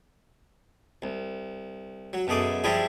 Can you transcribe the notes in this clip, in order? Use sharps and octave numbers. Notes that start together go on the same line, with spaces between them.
C2
F#3
F#2 B2 A3 G#4 D6
F3 G3 D4 E4 G4 G#4